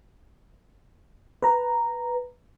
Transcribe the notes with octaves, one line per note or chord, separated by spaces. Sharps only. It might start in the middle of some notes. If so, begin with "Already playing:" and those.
B4 A#5